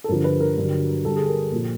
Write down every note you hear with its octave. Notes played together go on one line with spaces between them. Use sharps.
A4
G2 D3 F3 A#4
B4
A#4
G2 D3 F#3
G2 D3 G3 A4
G#4
A#4
A#2 F3